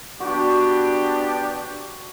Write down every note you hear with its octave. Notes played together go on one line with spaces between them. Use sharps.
B3 D4 F#4 G4